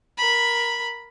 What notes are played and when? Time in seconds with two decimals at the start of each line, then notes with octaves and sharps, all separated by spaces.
0.17 A#4 B5